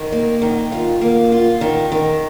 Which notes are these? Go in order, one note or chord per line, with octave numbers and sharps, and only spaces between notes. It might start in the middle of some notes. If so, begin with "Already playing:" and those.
Already playing: D#3
A#3
D#3
F4
A#3
F4
D#3
D#3